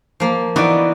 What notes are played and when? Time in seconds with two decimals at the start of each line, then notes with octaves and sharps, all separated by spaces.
0.20 F3 A#3
0.56 E3 B3 D#4 F#4 D5